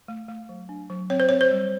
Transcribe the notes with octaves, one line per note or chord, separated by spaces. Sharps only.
A3
A3
F#3
D4
F#3
C4 C#5
C5
C4 C#5
C5
G3